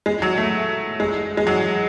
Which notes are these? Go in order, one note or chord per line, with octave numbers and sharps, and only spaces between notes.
G#3
F#3
A3
G#3
G#3
F#3